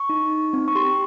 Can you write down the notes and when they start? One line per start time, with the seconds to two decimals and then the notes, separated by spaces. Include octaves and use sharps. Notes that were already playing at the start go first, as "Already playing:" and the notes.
Already playing: C#6
0.09 D#4
0.31 D#4
0.53 C4
0.68 C#6
0.75 G4 C6